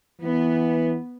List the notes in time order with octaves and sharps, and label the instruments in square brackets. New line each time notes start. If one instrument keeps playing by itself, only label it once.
[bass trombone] E3 [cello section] B3